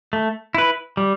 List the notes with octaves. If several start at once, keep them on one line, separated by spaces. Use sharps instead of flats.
A3
E4 B4
G3